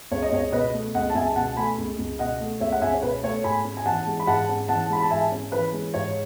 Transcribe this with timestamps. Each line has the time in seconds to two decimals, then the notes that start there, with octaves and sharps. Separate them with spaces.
0.11 C#2 C#5
0.23 D#5
0.32 C#2 C#5
0.52 B2 B4 D#5
0.74 A3
0.94 C#2 D#5 F#5
1.09 A5
1.15 C#2 E5 G#5
1.36 B2 F#5 A5
1.57 A3 G#5 B5
1.78 C#2
1.98 C#2
2.19 B2 D#5 F#5
2.40 A3
2.60 C#2 C#5 E5
2.72 F#5
2.81 C#2 E5 G#5
2.94 C#5
3.02 B2 B4
3.23 A3 C#5
3.44 G#2 G#5 B5
3.64 C#4
3.77 G#5
3.86 E3 F#5 A5
4.07 G#3
4.20 B5
4.27 G#2 F#5 A5
4.49 C#4
4.68 E3 F#5 A5
4.90 G#3 B5
5.02 A5
5.10 G#2 E5 G#5
5.32 C#4
5.52 E3 B4
5.73 G#3
5.94 G#2 C#5